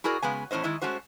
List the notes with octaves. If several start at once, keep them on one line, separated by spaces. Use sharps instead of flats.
E4 F#4 G#4 A#4 D5
C#3 G#3 B3 G#5
E2 A2 C#4 C5 D#5
D#3 G#3 E4 D#5
G#3 A3 C#4 F#4 C5